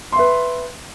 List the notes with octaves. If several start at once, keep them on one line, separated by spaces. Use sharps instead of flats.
B4 E5 C6